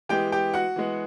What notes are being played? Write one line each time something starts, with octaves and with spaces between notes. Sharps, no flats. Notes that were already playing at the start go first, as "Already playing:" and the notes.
E3 G#3 B3 G4 G5
G4 G5
F#4 F#5
E3 G#3 B3